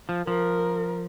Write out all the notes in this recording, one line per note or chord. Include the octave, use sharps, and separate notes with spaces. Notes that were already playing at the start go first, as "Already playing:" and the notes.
F3
F3 A#4